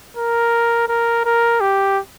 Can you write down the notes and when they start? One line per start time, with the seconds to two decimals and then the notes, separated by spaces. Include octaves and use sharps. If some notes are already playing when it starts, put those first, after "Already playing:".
0.17 A#4
0.88 A#4
1.25 A#4
1.61 G4